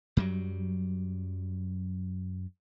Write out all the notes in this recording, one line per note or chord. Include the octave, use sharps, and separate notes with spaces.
F#2 F#3 G3